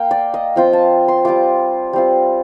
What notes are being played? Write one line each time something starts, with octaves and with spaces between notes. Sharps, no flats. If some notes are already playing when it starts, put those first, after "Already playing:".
Already playing: A#3 F5 G5
D5
D#5
F3 C4 F4 G5
A5
C6
G3 C4 F4 D6
G3 C4 F4